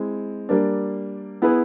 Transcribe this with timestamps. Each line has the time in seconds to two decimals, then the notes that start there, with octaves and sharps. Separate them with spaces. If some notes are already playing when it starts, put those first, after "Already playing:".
Already playing: G#3 C4 E4
0.49 G3 A#3 D4
1.42 B3 E4 G#4 B4